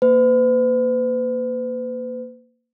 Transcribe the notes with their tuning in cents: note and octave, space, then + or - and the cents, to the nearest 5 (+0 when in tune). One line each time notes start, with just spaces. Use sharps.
A#3 +0 B4 +45